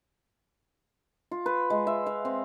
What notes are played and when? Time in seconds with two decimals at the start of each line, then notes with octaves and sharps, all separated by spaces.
1.31 F4
1.46 B4
1.70 G#3
1.87 E5
2.06 F5
2.25 C4